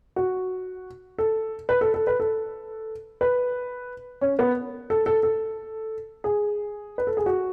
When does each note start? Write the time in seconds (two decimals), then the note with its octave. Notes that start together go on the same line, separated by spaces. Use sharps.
0.16 F#4
1.18 A4
1.69 B4
1.81 A4
1.94 A4
2.07 B4
2.20 A4
3.21 B4
4.21 C#4
4.39 B3
4.90 A4
5.06 A4
5.23 A4
6.24 G#4
6.98 B4
7.07 A4
7.17 G#4
7.26 F#4